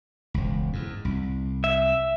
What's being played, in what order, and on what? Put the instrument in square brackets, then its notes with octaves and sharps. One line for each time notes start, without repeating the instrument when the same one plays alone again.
[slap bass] E1 C#2
E2 G#2
C2
[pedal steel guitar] E5